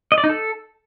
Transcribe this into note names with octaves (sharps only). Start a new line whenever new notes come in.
D#5
D5
D#4
A4